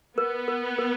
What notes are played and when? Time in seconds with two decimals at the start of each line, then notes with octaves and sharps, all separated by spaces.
0.18 B3 A#4
0.48 A#4
0.78 A#4